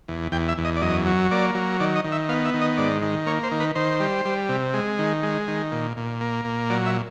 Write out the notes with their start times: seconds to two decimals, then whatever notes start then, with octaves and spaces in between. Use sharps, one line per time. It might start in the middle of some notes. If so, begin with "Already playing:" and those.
0.08 E2
0.32 E2 G5
0.48 E5
0.58 E2
0.65 D#5
0.76 D5
0.81 F#2 D#5
1.06 F#3
1.31 A#3 D5
1.55 F#3
1.80 D#3 D5
1.96 D#5
2.04 D#3
2.12 E5
2.29 B3 F5
2.45 E5
2.54 D#3
2.61 D#5
2.77 G#2 D5
3.02 D#3
3.26 A#3 C#5
3.43 C5
3.51 D#3
3.60 B4
3.75 D#3 C5
4.00 G3
4.25 G3
4.49 C3
4.74 G#3
4.99 D#3
5.23 G#3
5.48 D#3
5.72 A#2
5.97 A#2
6.21 A#3
6.45 A#2
6.70 F#3 D5
6.86 E5